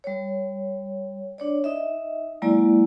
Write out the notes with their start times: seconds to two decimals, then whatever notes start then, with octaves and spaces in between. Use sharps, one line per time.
0.04 G3 C#5
1.38 D4 C#5 D5
1.64 D#4 D#5 E5
2.42 F#3 G#3 A#3 E4 D5